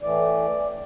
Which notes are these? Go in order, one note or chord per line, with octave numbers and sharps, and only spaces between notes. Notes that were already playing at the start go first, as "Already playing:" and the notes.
A2 E3 A3 D5